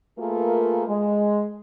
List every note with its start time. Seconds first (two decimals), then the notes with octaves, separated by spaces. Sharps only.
0.19 A3 A#3 F4 G#4 A#4 B4
0.87 G#3